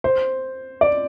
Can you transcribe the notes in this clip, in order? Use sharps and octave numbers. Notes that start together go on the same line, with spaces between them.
C5
D5